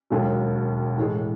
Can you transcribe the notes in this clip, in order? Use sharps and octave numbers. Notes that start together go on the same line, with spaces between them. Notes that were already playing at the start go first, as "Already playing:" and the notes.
E1 D#2 D#3 F#3
A2 E3 G#3